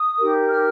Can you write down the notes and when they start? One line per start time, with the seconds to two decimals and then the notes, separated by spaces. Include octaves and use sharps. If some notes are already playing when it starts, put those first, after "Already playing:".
Already playing: D#6
0.18 D#4 G4 A#4
0.48 F6